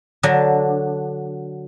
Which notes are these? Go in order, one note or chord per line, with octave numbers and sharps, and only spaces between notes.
D3 F#3 D4